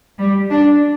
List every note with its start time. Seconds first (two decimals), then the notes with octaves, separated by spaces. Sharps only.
0.18 G3
0.50 D4